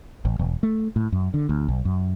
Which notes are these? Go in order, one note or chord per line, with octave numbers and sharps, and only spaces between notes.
A1
E1
A3
A2
F#2
D3
D2
B1
F#2